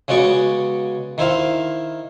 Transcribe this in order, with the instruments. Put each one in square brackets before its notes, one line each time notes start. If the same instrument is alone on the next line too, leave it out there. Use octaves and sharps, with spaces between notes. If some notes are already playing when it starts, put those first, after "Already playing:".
[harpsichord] C#3 G#3 B3 F#4 D5 C#6
D#3 E4 C5 F5